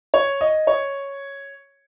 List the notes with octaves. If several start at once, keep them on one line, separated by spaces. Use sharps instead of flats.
C#5
D#5
C#5